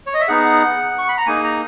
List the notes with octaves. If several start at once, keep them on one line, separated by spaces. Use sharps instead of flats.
C#5
D#5
E5
B3 D#4 G#4 F#5
C#6
B5
A#5
A#3 D#4 G#4 G#5
A#5